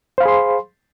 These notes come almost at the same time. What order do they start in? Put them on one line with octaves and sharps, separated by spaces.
C5 F5 B5 G#4 C6